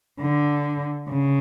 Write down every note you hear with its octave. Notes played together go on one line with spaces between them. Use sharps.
D3
C#3